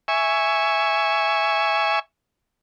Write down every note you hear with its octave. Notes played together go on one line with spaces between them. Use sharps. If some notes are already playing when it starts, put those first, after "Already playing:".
E5 G#5 C#6